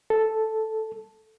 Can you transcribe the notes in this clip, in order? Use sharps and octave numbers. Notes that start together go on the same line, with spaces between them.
A4